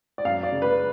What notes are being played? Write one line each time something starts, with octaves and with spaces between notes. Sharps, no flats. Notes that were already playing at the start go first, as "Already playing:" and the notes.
D5
F#2 F5
D5
C#3
B4